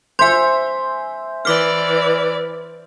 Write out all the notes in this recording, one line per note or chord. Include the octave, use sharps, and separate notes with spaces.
C5 E5 G#5 C6
E3 D5 D6 F6